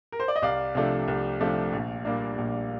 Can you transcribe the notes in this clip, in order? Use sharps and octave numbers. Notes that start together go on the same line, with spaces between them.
A#4
C5
D5
D#5
C2 D5 F5
C3 F3 A3 D4
C2
C3 F3 A3 D4
A#1
A#2 G3 A#3 D4
A#1